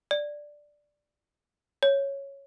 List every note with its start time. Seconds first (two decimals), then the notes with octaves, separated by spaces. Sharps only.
0.11 D5
1.83 C#5